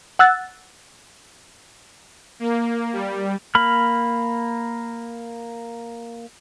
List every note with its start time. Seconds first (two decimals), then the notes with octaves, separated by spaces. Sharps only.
0.19 F#5 E6 F#6 A6
2.40 A#3
2.93 G3
3.55 A#3 B5 F6